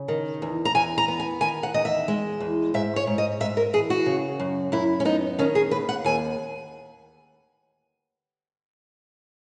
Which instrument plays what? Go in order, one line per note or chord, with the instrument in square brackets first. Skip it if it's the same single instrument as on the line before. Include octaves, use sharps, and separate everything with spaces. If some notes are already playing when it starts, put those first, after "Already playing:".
Already playing: [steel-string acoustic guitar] C#3
D#3
E2
A#5
E2 G#5
A#5
B3
G#5
D#3 G#5
F#5
E2 D#5
E5
G#3
E2
G#2 E5
C#5
G#2
D#5
G#2 E5
A#4
E3 G#4
F#4
C#3
F#2
F#2 E4
C#4
B3 D#4
D#3 C#4
G#4
D#2 B4
F#5
D#2 G#5